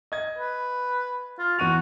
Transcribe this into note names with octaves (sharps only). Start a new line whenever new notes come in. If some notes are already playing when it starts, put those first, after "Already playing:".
D#5 G#6
B4
F4
E2 F#4 D#7 F7